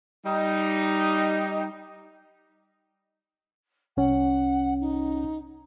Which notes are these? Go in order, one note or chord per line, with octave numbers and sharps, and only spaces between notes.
G3 D#4
C2 C#4 F#5
D#4